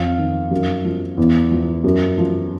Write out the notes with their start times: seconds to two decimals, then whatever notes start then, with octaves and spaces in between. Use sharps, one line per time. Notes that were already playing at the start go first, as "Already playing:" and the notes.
Already playing: F2 F5
0.18 D#3
0.51 F#2
0.85 F3
1.17 E2
1.51 F3
1.84 F#2
2.18 F3